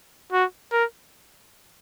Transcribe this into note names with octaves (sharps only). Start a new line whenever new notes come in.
F#4
A#4